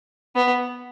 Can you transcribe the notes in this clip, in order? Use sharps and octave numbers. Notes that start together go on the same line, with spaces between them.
B3